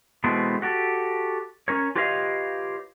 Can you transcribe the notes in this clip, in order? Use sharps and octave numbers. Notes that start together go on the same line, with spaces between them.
B2 E3 G#3 A3 B3 C4
F#4 G4 A4
C#4 A#4 C#5
F4 G4 B4 C#5 D#5 F5